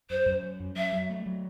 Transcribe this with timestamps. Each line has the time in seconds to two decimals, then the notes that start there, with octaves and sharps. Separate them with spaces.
0.10 F#2 C5
0.26 F#2
0.42 F#3
0.60 F#2
0.76 F#3 E5
0.92 F#3
1.10 A3
1.26 F#3